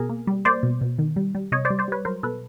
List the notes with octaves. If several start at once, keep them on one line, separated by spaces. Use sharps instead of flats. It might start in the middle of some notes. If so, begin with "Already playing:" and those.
Already playing: B2 G#4 A#4
A#3
G3
A#3 C5 D5
B2
B2
D#3
G3
G3
C3 C#5 D#5
C5 D5
G3
C5 D5
G3 B4 C#5
F#3 A#4 C5
B2 A4 B4